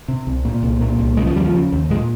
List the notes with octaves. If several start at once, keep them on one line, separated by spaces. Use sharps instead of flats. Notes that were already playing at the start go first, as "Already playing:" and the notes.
C3
C2
A#2
C2
A#2
C2
C#3 G#3
F3
D#2 G3
F3
C#3
D#2
A#2 G#3